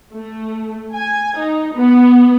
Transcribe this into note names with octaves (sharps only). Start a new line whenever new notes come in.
A3
G#5
D#4
B3